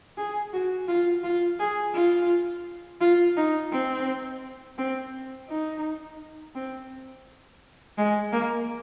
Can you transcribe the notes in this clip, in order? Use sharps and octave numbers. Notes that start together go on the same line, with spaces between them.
G#4
F#4
F4
F4
G#4
F4
F4
D#4
C4
C4
D#4
C4
G#3
A#3